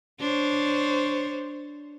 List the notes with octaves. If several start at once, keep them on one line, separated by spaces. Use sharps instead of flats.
D4 C5 C#5